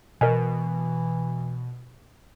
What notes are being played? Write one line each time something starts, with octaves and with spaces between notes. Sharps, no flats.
B2 E3 A#4 D#5 G#5